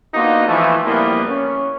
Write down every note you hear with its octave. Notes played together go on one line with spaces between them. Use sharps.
A#3 B3 D4 D#4 F4 F#4
E3 F3 A3
F2 A#2 G3 A#3 B3 E4
C#4